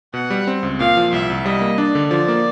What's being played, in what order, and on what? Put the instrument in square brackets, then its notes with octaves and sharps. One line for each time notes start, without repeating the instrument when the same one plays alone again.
[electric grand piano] B2 [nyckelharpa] F#5
[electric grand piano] G3
C4
C#2
[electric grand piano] A#2 [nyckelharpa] F5
[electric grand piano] F3
[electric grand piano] C2 [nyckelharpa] E5
[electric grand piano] C2
[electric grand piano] G3 [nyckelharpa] D#5
[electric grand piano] A#3
[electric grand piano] D4 [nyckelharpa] D5
[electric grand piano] D3
[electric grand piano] F3 [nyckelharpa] D5
[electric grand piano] A#3